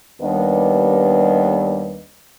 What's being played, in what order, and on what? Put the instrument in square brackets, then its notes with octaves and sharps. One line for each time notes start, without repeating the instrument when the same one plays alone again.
[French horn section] D#2 G3 B3 D4 B4 D#5